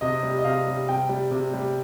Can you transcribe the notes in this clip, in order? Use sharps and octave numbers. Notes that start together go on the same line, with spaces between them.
C3 D#5
G3
D#5
C3 F5
G3
C3 G5
G3
C3
G3